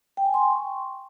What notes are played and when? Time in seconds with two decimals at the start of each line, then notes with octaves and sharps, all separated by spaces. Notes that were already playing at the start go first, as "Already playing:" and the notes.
0.17 G5
0.26 G#5
0.34 C6
0.42 G5
0.51 C#6